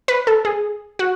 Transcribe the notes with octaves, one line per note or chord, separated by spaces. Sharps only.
B4
A4
G#4
F#4